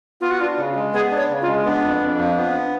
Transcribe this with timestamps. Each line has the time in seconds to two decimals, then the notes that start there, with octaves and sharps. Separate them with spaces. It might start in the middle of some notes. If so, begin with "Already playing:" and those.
0.21 B3 F4
0.31 F#4
0.40 D4 F4
0.58 C#3
0.75 G#3
0.93 B3 G#4
1.11 D4
1.17 C#5
1.29 C#3
1.42 F4
1.47 G#3
1.65 B3 D4
1.83 F2
2.01 F2
2.19 F3
2.37 B3